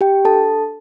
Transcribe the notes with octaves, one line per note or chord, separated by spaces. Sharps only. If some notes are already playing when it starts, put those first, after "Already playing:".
G4 G5
D4 A4 A5